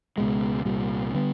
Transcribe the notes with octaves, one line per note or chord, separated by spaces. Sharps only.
C#2 B2 G#3
C2 A#2 G3
D3 G3 B3